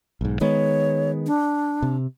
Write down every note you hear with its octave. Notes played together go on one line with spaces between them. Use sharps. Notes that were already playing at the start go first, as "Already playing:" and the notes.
B1 G#2
D#3 G#3 B3 C#5
D4
C3